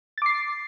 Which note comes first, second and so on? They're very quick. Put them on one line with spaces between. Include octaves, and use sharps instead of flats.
A6 D6 C7